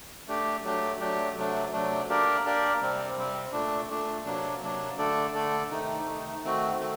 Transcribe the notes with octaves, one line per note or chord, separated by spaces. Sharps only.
A3 D4 G4
F#3 A3 D4 G4
F#3 A3 D4 G4
C3 F#3 A3 D4
C3 F#3 A3 D4
A#3 D4 G4 A#4 D5
A#3 D4 G4 A#4 D5
C3 G3 C4
C3 G3 C4
A#2 A3 D4
A#2 A3 D4
C3 F#3 A#3 D4
C3 F#3 A#3 D4
D3 A3 D4 A4 D5
D3 A3 D4 A4 D5
C3 D#3 A3 D#4
C3 D#3 A3 D#4
D#3 A3 C4 F#4
D#3 A3 C4